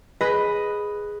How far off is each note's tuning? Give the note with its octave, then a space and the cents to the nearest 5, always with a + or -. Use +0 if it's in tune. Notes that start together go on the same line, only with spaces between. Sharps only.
G#4 +0 B4 +0 D#5 +0